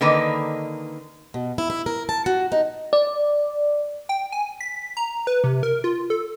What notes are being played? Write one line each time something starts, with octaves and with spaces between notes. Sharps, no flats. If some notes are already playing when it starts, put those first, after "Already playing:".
D3 D#3 A#3 B4 D#5
B2
E4
E4
A#4
A5
F#4
D#4
D5
G5
G#5
B6
A#5
B4
C3
A#4
F4
A4